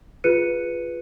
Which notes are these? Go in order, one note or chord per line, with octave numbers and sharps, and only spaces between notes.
F4 G#4 B4 F#6 C#7 D#7